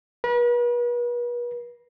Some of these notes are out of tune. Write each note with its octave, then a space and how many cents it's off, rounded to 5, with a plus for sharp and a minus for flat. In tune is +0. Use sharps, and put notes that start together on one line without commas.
B4 -40